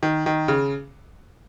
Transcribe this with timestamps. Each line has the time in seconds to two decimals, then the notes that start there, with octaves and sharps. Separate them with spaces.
0.03 D#3
0.26 D#3
0.48 C#3